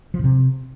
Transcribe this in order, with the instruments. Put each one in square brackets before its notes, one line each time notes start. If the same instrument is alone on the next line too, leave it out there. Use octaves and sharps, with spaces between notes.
[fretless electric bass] F3
A2
C3